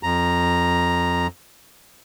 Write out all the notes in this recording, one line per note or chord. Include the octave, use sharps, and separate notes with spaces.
F2 A#5